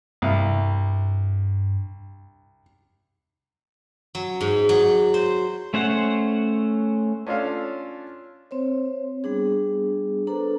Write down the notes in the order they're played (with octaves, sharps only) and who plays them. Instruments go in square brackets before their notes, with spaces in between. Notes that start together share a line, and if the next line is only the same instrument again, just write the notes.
[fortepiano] C2 [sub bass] G2
[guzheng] F#3
G#2
F#3
C5
[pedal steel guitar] A3 C#4 C5 C#5 F#5
[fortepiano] C#4 D4 F4 A4 F5
[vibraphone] C4 C5 C#5
G3 B3 D4 G#4
D4 A4 B4 C5 A#5